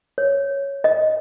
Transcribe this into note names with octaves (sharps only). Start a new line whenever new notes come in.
C#5
D#5